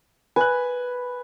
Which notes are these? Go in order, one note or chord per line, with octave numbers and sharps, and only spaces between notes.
B4 G#5 F#6